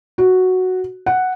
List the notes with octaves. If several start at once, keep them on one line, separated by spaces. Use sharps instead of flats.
F#4
F#5